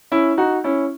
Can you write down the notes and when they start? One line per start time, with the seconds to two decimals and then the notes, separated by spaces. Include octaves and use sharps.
0.12 C#4 E4
0.38 D#4 F#4
0.64 C#4 E4